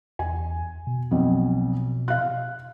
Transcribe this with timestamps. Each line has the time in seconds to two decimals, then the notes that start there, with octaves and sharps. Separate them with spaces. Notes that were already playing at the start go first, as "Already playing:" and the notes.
0.19 E2 G#5
0.87 B2
1.11 B1 F2
2.08 F5 F#6